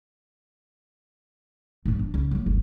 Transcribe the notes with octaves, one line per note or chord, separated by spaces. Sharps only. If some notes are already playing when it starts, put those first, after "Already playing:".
A#1 G2
D4
C#2
F#3 A#3
D1 G1